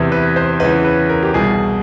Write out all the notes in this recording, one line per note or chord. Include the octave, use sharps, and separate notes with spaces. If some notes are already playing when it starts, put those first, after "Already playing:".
Already playing: E2 C3 E3
B4
C5
E2 C#3 E3 B4
B4
A#4
G4
C2 B2 G#4